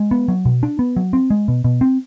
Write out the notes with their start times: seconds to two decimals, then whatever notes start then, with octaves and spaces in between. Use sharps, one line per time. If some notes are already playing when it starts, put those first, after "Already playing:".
Already playing: G#3
0.11 B3
0.28 F#3
0.45 B2
0.63 D4
0.79 B3
0.96 F#3
1.13 C4
1.30 G#3
1.48 B2
1.64 B2
1.81 C4